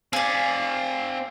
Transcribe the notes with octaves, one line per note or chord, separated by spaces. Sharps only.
C4 G#4 D5 F5 G#5